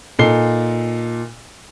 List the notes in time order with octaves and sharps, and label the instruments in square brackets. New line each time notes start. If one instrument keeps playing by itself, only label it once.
[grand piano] A#2 D#4 A4 C7 G7